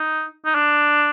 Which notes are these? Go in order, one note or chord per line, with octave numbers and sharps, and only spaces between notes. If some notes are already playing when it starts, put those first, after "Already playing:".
Already playing: D#4
D#4
D4